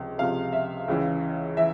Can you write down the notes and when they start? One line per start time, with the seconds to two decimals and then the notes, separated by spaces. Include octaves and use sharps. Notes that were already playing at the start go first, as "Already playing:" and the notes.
Already playing: C#2 C3 F3
0.18 C#2 C3 F3 F5
0.53 E5
0.88 C#2 C#3 E3
1.57 E3 E5